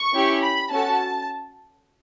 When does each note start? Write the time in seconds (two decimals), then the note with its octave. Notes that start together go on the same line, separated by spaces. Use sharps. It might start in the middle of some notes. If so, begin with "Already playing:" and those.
Already playing: C#6
0.14 C#4 E4 G4
0.42 B5
0.71 C#4 F#4 A4 A5